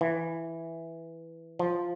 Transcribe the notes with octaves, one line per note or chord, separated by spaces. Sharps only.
E3
F3